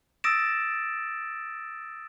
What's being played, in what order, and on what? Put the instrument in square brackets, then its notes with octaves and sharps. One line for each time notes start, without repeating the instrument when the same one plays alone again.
[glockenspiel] D#6 E6 A6 A#6 D7 E7